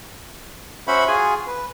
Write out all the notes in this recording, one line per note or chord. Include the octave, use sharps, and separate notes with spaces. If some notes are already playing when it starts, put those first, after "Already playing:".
C#4 F#4 C5 E5 F#5 B5
F4 F#4 G#4 G#5
B4